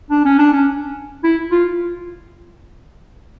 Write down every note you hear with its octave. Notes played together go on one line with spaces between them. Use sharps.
D4
C#4
D4
C#4
E4
F4